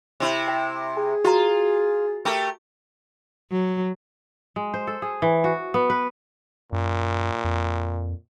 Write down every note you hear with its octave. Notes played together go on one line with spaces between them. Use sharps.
C3 E4
G5
G#4
F4 F#4 A#5
A3 G4 A#4
F#3
G#3
C5
A4
G#4
E3
F#4
B3
B4
F#2 A#2
F2